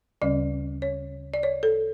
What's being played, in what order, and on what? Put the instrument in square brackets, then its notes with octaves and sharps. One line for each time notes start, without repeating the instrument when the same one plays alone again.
[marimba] D2 C#3 G3 C#4 D5
C#5
D5
C#5
A4